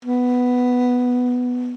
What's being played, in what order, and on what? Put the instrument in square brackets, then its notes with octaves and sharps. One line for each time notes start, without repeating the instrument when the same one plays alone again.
[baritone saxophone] B3